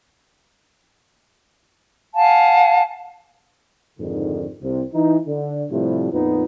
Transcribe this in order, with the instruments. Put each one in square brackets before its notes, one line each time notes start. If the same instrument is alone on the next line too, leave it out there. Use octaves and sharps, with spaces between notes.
[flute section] F5 F#5 G#5 A5
[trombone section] F2 G#2 D3 D#3
C2 C3
E3 D#4
D3
A2 C3 F3 G3
F2 A#2 B3 D#4